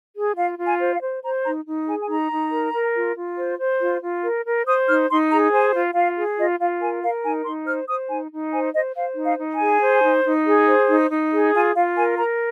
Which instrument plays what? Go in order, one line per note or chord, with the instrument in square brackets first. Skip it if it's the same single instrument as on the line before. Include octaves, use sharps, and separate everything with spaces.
[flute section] G#4
F4 F5
F4
G#5
C5
F5
C5
C5 A#5
D#4 A#5
D#4
G#4 G#5
G#5
D#4 A#5
D#4
A#4
A#4
F4
F4
C5
C5
F4
F4
A#4
A#4
C5 D#6
D#4 F6
D#4 C6
G#4 A#5
C5 G#5
F4
F4 F5
G#4
F4 D#5
F4 F5
A#4 G#5
A#4 F5
D#4 G#5
D#4 C6
C5 F6
C5 D#6
D#4 G#5
D#4
C5 G#5
C5 D#5
C5 F5
D#4
F5
D#4
G#5
G#4
C5
D#4
D#4
G#4
C5
D#4
D#4
G#4
F4 G#5
F4 F5
A#4 G#5
A#4 A#5